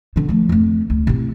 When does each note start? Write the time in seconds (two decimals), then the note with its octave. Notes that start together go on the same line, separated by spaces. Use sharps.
0.16 D3 C4
0.29 F3 A3
0.49 F2 A3
0.90 D2
1.07 C3 E4